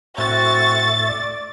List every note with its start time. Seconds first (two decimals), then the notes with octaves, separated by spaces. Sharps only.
0.18 A2 C4 F#4 E5 C#6 A6
1.08 D5